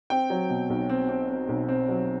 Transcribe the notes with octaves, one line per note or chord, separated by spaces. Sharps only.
C4 G5
F#3
B2
B1
C4
C4
C4
B1
C4
F#3